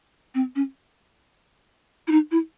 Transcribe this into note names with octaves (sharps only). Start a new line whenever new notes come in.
C4
C#4
E4
D#4
E4